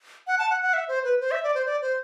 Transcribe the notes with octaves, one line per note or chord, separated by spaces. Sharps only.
F#5
A5
F#5
F#5
E5
C5
B4
C5
E5
D5
C5
D5
C5